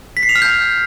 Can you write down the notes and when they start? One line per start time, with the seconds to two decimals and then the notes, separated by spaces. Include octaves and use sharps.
0.17 B6
0.23 C7
0.29 F7
0.35 F6
0.42 G6